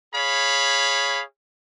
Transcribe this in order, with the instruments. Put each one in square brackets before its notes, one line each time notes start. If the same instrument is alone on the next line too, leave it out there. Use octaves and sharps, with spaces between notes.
[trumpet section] G#4 C#5 F5 B5